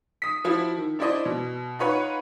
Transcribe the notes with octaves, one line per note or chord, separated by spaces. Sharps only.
D#6 B6
F3 E4 F#4
D#3
D4 E4 C5 D5 D#5
B2
D#4 F4 B4 C#5 F#5